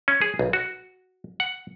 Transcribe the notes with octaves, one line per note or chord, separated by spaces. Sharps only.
C#4
G#4
B1
F#4
F#5